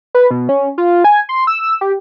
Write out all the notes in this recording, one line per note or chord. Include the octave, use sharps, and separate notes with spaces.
B4
B2
C#4
F4
G#5
C6
E6
G4